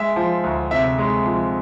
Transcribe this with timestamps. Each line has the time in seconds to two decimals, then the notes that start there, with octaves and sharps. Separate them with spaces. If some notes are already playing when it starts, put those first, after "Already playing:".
Already playing: G#3 E5
0.16 F3
0.43 D2
0.71 C3 E5
0.98 G#3
1.26 F3